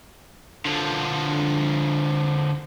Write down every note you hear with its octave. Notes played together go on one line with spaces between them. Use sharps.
D3 F3